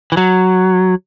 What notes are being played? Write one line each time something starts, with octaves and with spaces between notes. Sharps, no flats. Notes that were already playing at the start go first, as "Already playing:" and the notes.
E3
F#3